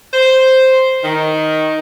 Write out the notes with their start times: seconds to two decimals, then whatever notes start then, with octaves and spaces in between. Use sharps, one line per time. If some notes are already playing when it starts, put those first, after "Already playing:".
0.14 C5
1.04 D#3